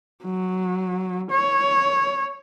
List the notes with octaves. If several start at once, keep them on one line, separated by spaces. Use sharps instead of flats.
F#3
C#5